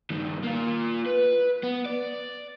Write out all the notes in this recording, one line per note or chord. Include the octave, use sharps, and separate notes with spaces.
G2 D#3
A#3 F4
B4
B3
D5